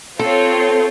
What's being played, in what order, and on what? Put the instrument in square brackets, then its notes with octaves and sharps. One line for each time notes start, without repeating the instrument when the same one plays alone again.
[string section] C4 F4 C#5 [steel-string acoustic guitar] A4